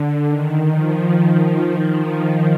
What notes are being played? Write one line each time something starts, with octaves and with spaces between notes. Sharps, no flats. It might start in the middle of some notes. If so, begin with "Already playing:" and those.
Already playing: D3
D#3
F3